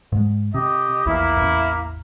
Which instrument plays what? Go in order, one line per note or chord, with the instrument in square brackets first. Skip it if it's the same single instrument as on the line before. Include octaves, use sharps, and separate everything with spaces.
[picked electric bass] G#2 G#3
[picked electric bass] C3 [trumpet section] G4 D#5
[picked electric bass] A#1 E2 [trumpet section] A#3 E4
[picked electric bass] A1 E2